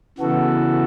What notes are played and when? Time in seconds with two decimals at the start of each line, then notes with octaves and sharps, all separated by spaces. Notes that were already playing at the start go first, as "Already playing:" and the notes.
0.18 C#3 E3 B3 F#4 A4